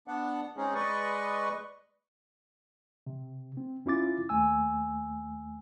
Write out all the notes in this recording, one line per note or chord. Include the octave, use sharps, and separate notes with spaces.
B3 D4 F#5
G#3 C4 C#4 D#4 G#4
G#3 B4 D5 D#5 C#6
C3
C4
F2 C#4 E4 F4 D6 A6
D#2 A3 G#5 E6